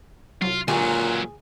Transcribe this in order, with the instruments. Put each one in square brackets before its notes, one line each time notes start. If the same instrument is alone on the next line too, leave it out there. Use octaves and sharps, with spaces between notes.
[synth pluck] C2 F#3 [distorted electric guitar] F4
[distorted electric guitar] C#2 F#3 [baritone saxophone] A#2 [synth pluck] D3 G4 D6 [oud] G#4